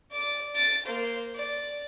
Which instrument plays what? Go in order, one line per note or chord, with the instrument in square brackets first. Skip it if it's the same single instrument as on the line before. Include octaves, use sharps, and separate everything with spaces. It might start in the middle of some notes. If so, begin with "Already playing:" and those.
[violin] D5 D6
A6 D7
A#3 C5
D5